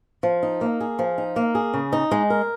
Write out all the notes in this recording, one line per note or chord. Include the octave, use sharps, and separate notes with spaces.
F3
D#4
A#3
G#4
F3
D#4
A#3
G#4
C#3
D#4
G#3
A#4